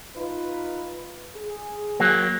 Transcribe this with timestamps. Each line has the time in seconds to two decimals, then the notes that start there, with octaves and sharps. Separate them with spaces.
0.16 D#4 F4 B4
1.35 G#4
2.00 F#3 A#3